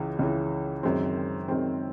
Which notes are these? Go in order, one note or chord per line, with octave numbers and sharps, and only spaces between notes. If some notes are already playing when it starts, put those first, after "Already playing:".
Already playing: C#2 C#3 E3
C#2 C#3 E3
F#2 D#3 G#3 C4
F#2 D#3 G#3 C4